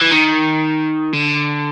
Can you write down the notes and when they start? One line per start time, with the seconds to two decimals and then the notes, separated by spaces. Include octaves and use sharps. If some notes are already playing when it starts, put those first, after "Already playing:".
0.01 E3
0.12 D#3
1.13 D3